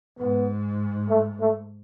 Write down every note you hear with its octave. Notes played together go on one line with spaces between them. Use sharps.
G#2 B3
A3
A3